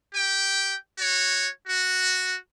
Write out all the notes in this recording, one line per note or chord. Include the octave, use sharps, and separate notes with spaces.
G4 G5
F#4 C#5
F#4